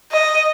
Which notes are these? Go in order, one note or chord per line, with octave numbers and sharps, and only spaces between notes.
D#5